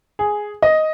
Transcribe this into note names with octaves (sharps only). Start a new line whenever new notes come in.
G#4
D#5